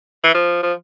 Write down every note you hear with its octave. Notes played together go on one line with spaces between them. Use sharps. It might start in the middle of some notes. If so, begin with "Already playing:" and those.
E3
F3
F3